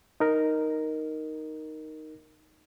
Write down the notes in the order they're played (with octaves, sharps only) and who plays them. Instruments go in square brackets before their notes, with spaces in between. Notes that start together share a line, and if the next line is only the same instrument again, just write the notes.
[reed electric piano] D#4 A#4